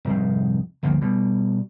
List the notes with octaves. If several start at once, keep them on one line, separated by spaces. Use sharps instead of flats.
F1 C2 G#2
G1 D2 F3 A#3
B2 G3